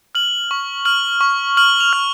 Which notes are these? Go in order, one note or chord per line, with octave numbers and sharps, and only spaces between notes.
F6 F#7
C#6
F6 F#7
C#6
F6 F#7
F7
F6